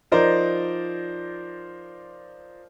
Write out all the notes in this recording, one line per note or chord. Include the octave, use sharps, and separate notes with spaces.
F3 D#4 A#4 C5 D5